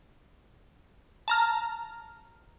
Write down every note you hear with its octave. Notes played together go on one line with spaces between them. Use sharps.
A5 A#5 F6